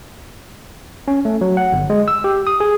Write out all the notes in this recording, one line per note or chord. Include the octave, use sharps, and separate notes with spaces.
C#4
A3
F#3
F#5
G1
G#3
E6
G4
D#6
G#4